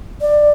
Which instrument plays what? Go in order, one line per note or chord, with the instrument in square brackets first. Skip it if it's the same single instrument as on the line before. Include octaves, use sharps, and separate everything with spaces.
[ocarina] D5